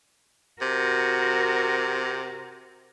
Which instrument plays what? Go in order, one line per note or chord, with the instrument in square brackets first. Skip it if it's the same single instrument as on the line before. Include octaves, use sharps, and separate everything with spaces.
[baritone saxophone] C3 [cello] F#4 A#4